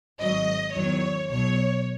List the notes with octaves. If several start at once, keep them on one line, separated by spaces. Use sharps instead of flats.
G#1 G#2 F#3 D#5
E2 D#3 F#3 C#5
B1 B2 F#3 C#5